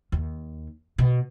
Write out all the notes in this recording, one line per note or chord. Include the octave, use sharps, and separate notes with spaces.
D#2
B2